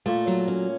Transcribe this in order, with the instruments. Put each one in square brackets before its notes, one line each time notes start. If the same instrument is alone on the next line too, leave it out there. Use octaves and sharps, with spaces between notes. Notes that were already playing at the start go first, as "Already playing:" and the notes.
[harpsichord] A#2 [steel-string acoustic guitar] A3
[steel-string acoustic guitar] F#3
C#4